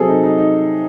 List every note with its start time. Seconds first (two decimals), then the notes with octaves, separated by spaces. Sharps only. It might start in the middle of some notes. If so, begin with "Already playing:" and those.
Already playing: C3 F#3 C4 G#4 A4
0.09 D#4
0.23 D#4
0.38 D#4